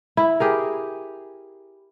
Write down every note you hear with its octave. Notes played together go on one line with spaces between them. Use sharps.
E4
G4 G#4 A#4